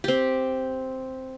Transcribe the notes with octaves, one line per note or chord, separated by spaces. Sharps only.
C4 G4